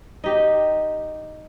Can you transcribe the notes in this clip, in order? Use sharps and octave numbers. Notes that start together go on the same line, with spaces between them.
D#4 G4